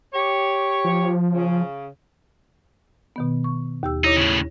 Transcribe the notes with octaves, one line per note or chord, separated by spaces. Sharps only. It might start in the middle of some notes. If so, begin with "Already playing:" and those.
G4 C#5
F3
C#3
B2 D#3 B3
C#6
D#2 G4 E6
D#4 E4 C#5 D6
A2 C#3